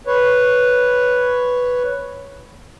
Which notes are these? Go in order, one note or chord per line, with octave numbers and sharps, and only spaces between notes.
B4 C#5